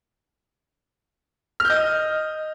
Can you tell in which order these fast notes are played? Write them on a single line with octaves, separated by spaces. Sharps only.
F6 G6 D#5